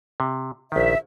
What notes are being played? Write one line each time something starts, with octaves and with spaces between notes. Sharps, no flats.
C3
A#1 D#3 E5